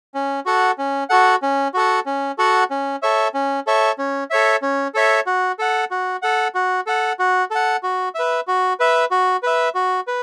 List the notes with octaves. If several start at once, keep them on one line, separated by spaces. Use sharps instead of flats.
C#4
F#4 A4 F#5
C#4
F#4 A4 F#5
C#4
F#4 A4 F#5
C#4
F#4 A4 F#5
C#4
A4 C#5 E5
C#4
A4 C#5 E5
C#4
A4 C#5 E5
C#4
A4 C#5 E5
F#4
A4 F#5
F#4
A4 F#5
F#4
A4 F#5
F#4
A4 F#5
F#4
B4 E5
F#4
B4 E5
F#4
B4 E5
F#4
B4